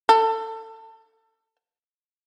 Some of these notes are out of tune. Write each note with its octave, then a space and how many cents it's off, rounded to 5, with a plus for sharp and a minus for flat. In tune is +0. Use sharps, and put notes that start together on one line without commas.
A4 +25